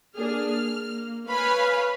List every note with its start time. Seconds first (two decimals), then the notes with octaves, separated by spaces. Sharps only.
0.17 A#3 D4 G#4 F6
0.62 A#3
1.28 B4 C#5 F5 G#5 B5 F6